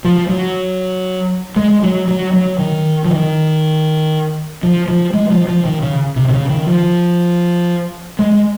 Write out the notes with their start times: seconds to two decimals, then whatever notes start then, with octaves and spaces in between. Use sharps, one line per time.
0.05 F3
0.29 F#3
1.56 G#3
1.83 F#3
2.08 F#3
2.33 F#3
2.58 D#3
3.05 F3
3.10 D#3
4.63 F3
4.88 F3
5.13 G#3
5.30 F3
5.47 F3
5.65 D#3
5.82 C#3
6.16 C3
6.28 C3
6.33 C#3
6.49 D#3
6.66 F3
8.19 G#3